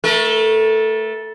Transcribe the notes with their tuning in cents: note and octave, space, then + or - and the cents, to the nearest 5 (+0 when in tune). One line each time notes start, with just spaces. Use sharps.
A3 +0 A#4 +45